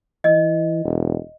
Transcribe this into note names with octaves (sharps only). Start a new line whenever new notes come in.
E3 D#5
E1